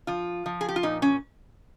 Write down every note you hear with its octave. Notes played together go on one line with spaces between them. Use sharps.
F3 F4
F3
G#4
G4
F4
A#2 D#4
C#4